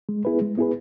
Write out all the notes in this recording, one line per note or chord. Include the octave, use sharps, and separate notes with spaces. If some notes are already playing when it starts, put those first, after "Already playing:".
G#3
B3 E4 G#4 B4
G#3
B3 E4 G#4 B4